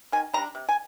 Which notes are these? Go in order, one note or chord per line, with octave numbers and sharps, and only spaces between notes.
D#3 G#5
G3 D4 A#5
C3
G#5